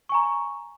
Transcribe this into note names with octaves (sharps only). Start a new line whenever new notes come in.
G#5 A#5 C#6